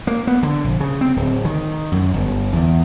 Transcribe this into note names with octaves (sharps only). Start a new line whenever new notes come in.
A#3
B3
D3
A#1
C#3
C4
D1
D#3
F#2
G1
E2